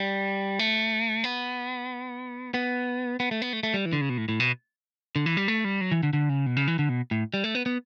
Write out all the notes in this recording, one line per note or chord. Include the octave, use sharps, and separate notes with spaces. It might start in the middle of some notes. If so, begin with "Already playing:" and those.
Already playing: G3
A3
B3
B3
B3
A3
B3
A3
A3
G3
E3
D3
C#3
B2
A2
A2
B2
D3
E3
G3
A3
G3
F#3
E3
D3
D3
C#3
B2
C#3
E3
D3
B2
A2
G3
A3
B3
B3